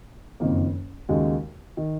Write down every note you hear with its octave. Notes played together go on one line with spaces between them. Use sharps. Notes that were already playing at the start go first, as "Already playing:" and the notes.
F#1 F2 D#3 A#3
D#2 C#3 G#3 D#4 F#4
D#3